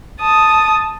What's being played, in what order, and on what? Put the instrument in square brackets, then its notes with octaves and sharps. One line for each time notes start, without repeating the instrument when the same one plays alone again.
[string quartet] A5 D#6